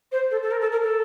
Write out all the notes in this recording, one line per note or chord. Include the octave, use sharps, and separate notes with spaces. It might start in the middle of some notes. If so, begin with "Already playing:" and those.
C5
A4
A4
A#4
A4
A#4
A4